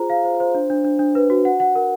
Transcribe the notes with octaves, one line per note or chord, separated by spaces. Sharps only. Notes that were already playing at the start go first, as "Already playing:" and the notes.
Already playing: F4 G#4 C5 A#5
F5
C5
C5
D4
D4
D4
D4
B4
F#4
F#5
F#5
A#4